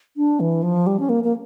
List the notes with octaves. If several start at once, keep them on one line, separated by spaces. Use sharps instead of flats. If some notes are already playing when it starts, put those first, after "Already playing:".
D4
E3
F3
G3
C#4
A#3
A#3